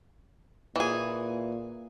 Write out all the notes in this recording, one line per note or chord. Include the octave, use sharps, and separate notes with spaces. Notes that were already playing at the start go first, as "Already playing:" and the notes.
A#2 E3 G#4